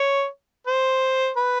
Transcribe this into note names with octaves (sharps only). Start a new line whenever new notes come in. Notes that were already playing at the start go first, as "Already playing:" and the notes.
Already playing: C#5
C5
B4